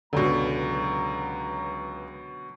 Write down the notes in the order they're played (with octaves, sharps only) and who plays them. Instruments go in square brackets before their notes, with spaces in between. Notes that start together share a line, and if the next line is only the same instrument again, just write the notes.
[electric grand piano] C#2 [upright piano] F#2 B2 [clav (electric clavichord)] D3 [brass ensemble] F#3 A#5